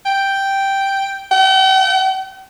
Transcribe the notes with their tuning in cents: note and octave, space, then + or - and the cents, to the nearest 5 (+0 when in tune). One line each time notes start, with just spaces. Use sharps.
G5 +0
G5 -45